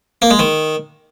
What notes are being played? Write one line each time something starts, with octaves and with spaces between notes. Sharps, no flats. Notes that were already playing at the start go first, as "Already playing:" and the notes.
A#3
G#3
D#3